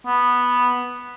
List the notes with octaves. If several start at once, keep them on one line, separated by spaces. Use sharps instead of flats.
B3